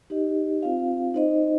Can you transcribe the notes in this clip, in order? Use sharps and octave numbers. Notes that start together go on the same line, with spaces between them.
D#4 G4 D#5
C4 F4 C5 F5
D#4 C5 D#5